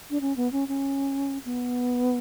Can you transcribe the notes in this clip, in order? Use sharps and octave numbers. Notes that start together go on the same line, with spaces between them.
D4
C#4
B3
C#4
C#4
B3